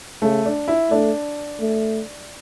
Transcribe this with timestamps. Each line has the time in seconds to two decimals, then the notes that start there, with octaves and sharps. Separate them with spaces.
0.22 C#3 A3
0.45 D4
0.68 E4
0.91 A3 D4
1.61 A3